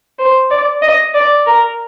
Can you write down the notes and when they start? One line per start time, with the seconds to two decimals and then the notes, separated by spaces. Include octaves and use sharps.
0.19 C5
0.50 D5
0.82 D#5
1.14 D5
1.46 A#4